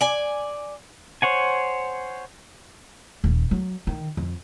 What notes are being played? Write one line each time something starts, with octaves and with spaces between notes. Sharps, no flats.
D5 G#5
C5 C#5 F#5 G#5
D#1
F#3
D#3
F2